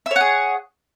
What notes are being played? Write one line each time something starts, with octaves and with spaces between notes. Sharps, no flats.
G#4 C#5 E5 F#5